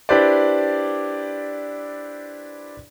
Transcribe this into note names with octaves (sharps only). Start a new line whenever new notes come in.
D4 E4 G4 B4 C5 D5